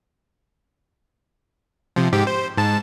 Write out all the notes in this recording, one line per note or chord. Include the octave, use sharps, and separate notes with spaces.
C3 F3
G#2 G4
C5
G#2 A5